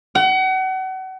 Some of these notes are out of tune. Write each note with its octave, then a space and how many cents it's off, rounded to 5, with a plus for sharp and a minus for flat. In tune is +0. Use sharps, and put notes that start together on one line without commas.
F#5 +35